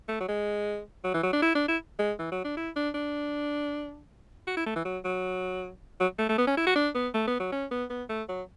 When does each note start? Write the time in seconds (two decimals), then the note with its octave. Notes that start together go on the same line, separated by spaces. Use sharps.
0.08 A3
0.20 F#3
0.28 G#3
1.04 F#3
1.14 E3
1.23 F#3
1.33 D4
1.42 E4
1.55 D4
1.68 E4
1.99 G#3
2.19 E3
2.32 F#3
2.44 D4
2.57 E4
2.76 D4
2.94 D4
4.47 F#4
4.57 E4
4.66 A3
4.75 E3
4.85 F#3
5.05 F#3
6.00 F#3
6.19 A3
6.29 A3
6.38 B3
6.47 C#4
6.57 E4
6.67 F#4
6.75 D4
6.95 B3
7.14 A3
7.27 B3
7.40 F#3
7.52 C#4
7.71 B3
7.90 B3
8.09 A3
8.29 F#3